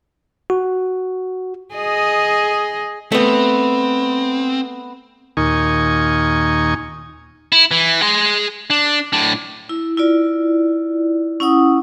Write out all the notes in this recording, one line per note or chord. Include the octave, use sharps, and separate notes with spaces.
F#4
G#4 D#5
A3 B3 C4
D#2 A#2 D#4 G#5 C#6
E4
E3
G#4 C6
D4
A2 D4
E4
E4 F4 D5
C#4 E4 F#5 D#6